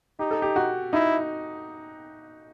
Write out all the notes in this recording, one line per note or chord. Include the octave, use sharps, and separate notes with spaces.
D#4 G4
A4
G4
F#4
D#4 E4